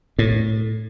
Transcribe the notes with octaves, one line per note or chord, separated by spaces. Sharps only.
A2